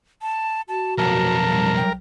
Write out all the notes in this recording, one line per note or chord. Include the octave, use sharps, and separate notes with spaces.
A5
F#4 A5
B1 F2 A#4 A5
G3
G5